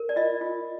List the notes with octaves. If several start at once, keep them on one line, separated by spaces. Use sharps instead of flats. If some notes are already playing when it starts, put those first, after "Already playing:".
Already playing: A#4
D5
F4 D#5
F4